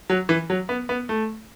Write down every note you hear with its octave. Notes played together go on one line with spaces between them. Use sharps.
F#3
E3
F#3
B3
B3
A3